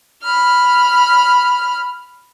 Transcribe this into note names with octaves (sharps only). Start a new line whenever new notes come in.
B5 F6